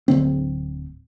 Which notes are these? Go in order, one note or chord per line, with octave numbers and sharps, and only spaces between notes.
D1 D3 C4